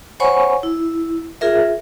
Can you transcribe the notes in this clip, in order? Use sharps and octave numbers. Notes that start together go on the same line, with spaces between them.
C5 C#5 F#5 G#5 B5 C#6
E4
F4 G#4 A#4 E5